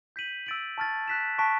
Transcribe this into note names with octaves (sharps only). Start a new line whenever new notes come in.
G6 B6 D#7 F#7
E6 A6 D7 F#7
A5 C#6 F6 A6
F#6 B6 E7
A5 C#6 F#6 B6 D7